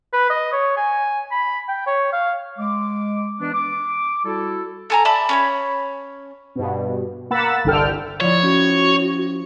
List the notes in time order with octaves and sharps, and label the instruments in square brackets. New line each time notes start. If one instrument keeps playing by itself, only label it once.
[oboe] B4
D#5
C#5
G#5
B5
G5
C#5
F5
[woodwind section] G#3 D6
E3 G#3 B3 D4
D6
G3 E4 F#4 A4
[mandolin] A4 G#5 A#5
D5 E5 A5 B5
C#4 C#5 B5
[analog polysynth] G2 B2
A#3 F#5 B5 E6 A6
G1 C2 D3 A4 G5 F6
[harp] F3 E4 [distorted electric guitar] C#5 [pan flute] D5
[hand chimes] C#4 [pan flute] F#4